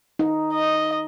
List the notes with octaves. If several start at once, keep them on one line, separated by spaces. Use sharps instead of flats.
D#4
D#5